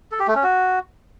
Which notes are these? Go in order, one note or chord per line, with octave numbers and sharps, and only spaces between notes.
A4
G4
A3
C#4
F#4